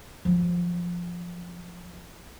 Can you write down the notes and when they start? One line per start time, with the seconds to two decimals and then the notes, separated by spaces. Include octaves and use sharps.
0.25 F3 F#3